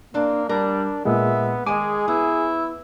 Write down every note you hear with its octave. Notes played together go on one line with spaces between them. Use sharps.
A#3 C4 D4
G3 D4 A#4
A#2 G#3 B3 E5
D#3 G#3 G#4 G#5 D6
B3 E4